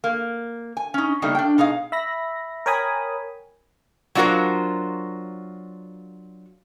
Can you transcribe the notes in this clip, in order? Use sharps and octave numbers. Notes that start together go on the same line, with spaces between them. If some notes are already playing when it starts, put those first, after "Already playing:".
A#3
G#5
C#4 D#4
C#3 G3 A3 A#3 D4 D#4
D4 G5
B2 D#4 G#4 F5
E5 B5 A#6
A#4 C#5 G5 G#5 B5 D#6
F#3 D4 F4 F#4 A#4 C5